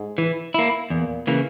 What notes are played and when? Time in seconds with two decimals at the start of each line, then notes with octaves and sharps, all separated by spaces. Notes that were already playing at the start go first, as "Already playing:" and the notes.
Already playing: G#2
0.18 E3
0.54 A#3 E4
0.90 E2 A#2
1.27 C#3 E3 A#3